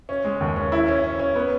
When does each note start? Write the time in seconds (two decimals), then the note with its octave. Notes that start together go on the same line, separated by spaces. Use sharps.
0.09 C#4
0.25 G#3
0.40 D#2
0.56 C#4
0.72 E4
0.88 C#4
1.04 C#4
1.19 C#4
1.35 B3